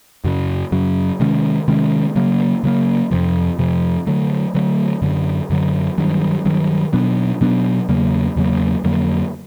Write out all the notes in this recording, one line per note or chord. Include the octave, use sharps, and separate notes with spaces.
F#2 C#3 F#3
F#2 C#3 F#3
C3 D#3 G#3 C#4
C3 D#3 G#3 C#4
C#3 F#3 A#3
C#3 F#3 A#3
F2 C3 F3
F2 C3 F3
D3 F#3 A3
D3 F#3 A3
F#2 D3 F#3
F#2 D3 F#3
G2 D#3 F#3
G2 D#3 F#3
B2 F#3 B3 D4
B2 F#3 B3 D4
E2 C#3 F#3 A#3
E2 C#3 F#3 A#3
F2 D3 F#3 A#3